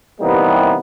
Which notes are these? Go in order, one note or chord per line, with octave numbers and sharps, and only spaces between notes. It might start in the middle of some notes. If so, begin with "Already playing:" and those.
C3 E3 G3 A#3 B3 D#4